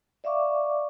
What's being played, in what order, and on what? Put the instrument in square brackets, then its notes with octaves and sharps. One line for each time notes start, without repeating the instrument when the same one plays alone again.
[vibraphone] D5 E5 F5 C#6 D6